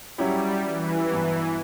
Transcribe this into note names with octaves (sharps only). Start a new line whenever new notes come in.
F#3 G3 C#4 E4 G4 C#5
E3
G2 F#3 B3